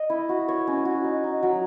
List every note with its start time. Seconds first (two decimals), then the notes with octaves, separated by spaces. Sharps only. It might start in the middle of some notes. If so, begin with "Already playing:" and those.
Already playing: D#5
0.10 E4
0.29 F#4
0.48 C#5
0.67 C#4
0.85 F#4
1.04 D#4
1.24 D#4
1.43 F#3